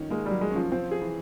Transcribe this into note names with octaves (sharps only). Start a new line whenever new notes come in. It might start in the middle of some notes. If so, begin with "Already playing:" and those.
Already playing: D#3 C#4
G#3 A#3
F#3 G3
G#3
C#4
F3
F3 C4
G#4
E3